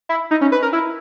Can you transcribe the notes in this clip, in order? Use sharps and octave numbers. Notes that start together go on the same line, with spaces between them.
E4
D#4
C#4
B4
A#4
E4